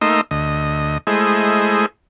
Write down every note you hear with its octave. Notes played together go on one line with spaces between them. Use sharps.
A3 A#3 D#4 D#5 C6 E6
D2 D#5
G#3 A3 E4 G#4 C5 D#5